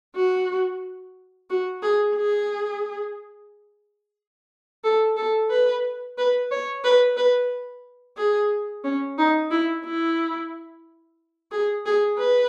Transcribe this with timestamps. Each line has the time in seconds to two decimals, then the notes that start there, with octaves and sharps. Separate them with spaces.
0.16 F#4
1.50 F#4
1.83 G#4
2.16 G#4
4.84 A4
5.17 A4
5.50 B4
6.18 B4
6.51 C#5
6.84 B4
7.17 B4
8.17 G#4
8.84 C#4
9.18 D#4
9.51 E4
9.85 E4
11.52 G#4
11.86 G#4
12.19 B4